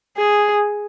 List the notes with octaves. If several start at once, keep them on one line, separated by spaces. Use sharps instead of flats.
G#4